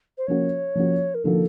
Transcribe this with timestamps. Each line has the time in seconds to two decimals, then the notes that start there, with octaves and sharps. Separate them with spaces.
0.18 C5
0.27 F3 A#3 C#4 F#4 C#5
0.75 F3 A#3 C#4 F#4
1.15 A#4
1.24 D3 F3 A#3 D#4 F#4 A4